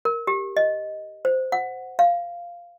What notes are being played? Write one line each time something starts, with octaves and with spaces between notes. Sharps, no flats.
A#4
G4
D#5
C5
F#5
F5